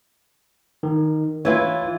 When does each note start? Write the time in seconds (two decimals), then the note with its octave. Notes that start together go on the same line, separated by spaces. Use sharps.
0.83 D#3
1.45 E3 E4 F4 C#5 G#6